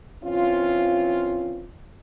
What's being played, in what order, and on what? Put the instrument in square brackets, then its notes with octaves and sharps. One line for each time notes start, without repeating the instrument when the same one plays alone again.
[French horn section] E3 C4 C#4 F4